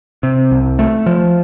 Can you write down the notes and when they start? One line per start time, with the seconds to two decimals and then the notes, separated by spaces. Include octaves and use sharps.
0.23 C3
0.52 C2
0.79 A3
1.06 F3